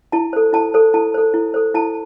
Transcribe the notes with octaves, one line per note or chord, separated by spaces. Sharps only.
E4 A5
A4 C5
E4 A5
A4 C5
E4 A5
A4 C5
E4
A4 C5
E4 A5